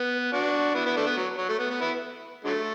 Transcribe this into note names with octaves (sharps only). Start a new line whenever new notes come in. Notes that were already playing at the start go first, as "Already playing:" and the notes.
Already playing: B3
D4 F#4
B3 E4
B3 E4
A3 D4
B3
F#3
F#3
A3
B3
B3
B3 E4
D3 F#3 A3